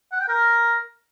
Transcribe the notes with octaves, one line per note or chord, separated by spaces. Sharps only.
F#5
G5
A#4